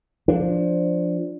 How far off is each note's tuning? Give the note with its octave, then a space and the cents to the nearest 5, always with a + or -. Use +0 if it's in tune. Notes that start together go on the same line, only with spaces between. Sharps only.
F3 +0 D4 +0